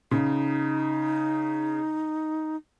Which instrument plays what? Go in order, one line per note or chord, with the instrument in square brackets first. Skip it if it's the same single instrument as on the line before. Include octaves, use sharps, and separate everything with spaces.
[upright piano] C#3 [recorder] D#4